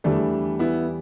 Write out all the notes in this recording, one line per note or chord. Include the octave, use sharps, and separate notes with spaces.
E2 E3 G3 A3 D4
B3 E4